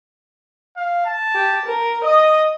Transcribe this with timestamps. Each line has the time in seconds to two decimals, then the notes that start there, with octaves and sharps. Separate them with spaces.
0.77 F5
1.06 A5
1.35 G4
1.65 A#4
2.04 D#5 D#6